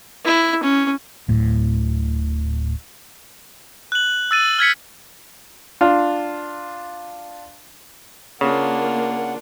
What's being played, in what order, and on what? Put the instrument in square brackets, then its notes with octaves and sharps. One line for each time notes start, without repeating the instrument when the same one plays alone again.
[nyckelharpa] E4
C#4
[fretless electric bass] D1 A2
[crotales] F#6 F#7
E6 A6 D#7
F6 G#6 B6 C#7
[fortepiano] D4 F4
[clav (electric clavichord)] C#3 [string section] A#3 [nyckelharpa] D4 F4 [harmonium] F#5